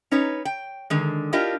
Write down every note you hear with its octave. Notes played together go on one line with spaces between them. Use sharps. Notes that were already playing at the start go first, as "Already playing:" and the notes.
C#4 D#4 B4 C#5
G5
D3 D#3 G#3
D4 E4 F4 G4 A#4 D#5